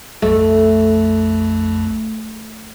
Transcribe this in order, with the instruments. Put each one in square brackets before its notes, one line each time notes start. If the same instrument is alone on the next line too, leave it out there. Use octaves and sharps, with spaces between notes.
[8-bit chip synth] A#1 F2 [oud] A3